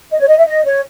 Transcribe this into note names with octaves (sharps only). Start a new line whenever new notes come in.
D#5
C#5
D#5
E5
D#5
C#5